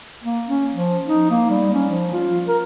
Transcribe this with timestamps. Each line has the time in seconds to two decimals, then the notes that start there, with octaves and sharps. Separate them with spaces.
0.24 A#3
0.48 C#4
0.73 F3
1.08 D#4
1.30 A#3
1.50 G3
1.74 C#4
1.89 F3
2.13 F4
2.48 A#4